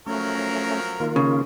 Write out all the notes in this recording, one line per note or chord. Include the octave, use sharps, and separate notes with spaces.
F3 F#3 A3 C#4 A#4
D#3 A#3 F4
C#3